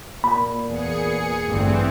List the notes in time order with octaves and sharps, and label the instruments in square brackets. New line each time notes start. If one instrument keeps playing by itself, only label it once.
[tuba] A#2 [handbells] B5
[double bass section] E2 B3 [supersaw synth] G#4 C#7
[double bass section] A1 G2 D3 [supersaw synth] E3 C4